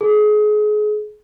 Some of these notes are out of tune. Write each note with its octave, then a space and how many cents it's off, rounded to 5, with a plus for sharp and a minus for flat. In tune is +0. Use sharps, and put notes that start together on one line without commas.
G#4 +30